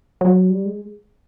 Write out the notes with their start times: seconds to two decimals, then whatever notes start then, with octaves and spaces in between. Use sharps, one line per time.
0.21 F#3
0.50 G3
0.66 G#3